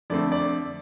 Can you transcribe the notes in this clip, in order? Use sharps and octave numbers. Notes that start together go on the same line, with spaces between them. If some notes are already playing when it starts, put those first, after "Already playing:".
F2 D3 A3 C4 D5
D5